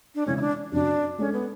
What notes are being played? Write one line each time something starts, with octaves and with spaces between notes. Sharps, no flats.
D4
C#3 E3 G#3 C#4
E4
D4
F#2 C#3 F#3 D4
G#3 C#4 D4 A4
B3